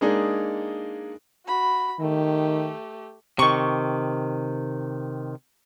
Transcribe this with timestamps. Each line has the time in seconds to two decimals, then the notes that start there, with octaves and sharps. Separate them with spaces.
0.01 G#3 A#3 D4 D#4 G#4
1.46 F#4 B5
2.00 D#3 A3 G4
3.39 C3 D#3 C#6